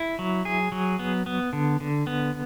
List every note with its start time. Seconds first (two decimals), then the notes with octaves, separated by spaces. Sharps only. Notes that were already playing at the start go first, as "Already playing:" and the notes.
Already playing: E4
0.19 F#3
0.45 G#4
0.72 F#3
0.99 B3
1.26 B3
1.53 D3
1.80 D3
2.07 B3